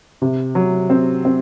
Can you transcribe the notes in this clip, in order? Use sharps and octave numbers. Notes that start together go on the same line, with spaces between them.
C3
F#3
C4
C4